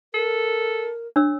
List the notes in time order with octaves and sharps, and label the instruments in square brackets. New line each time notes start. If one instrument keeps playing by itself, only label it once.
[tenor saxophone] A4 [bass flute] A#4
[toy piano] D4 C#5 E6